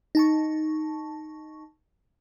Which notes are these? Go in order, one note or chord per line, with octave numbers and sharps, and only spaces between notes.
D#4 A5 C#6